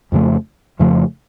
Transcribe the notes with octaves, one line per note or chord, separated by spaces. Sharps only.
F2 C#3 F3 A3
F2 C#3 F3 A3